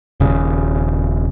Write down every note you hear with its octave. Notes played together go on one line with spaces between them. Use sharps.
D#1 C#3